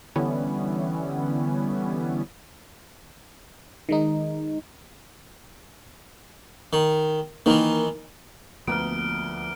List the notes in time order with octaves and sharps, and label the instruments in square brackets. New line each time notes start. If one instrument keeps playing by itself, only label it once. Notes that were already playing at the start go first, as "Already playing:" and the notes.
[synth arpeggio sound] D3 E3 G3 B3 C#4 E4
[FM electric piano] D#3 G#3 D#4
[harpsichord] D#3
[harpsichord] D#3 E3 [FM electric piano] A#3 D#4 A#4
[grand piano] D2 [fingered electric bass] F3 [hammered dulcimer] A#3 B3 [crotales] F6 D7